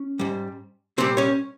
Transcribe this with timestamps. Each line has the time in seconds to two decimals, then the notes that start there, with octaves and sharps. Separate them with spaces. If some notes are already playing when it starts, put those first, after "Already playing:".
Already playing: C#4
0.19 G#2 G3
0.98 C2 A#2 G3 C4 C5
1.17 C#4 C#5